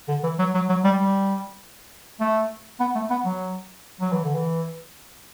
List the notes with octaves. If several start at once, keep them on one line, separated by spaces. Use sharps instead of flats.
D3
E3
F#3
F#3
F#3
G3
G3
A3
B3
A3
B3
F#3
F#3
E3
D3
E3